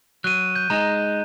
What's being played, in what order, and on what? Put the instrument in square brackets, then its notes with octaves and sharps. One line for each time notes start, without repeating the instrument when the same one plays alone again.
[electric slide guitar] F#3 [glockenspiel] F#6 D#7
[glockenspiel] G6
[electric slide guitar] G#3 D#4 [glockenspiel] A#5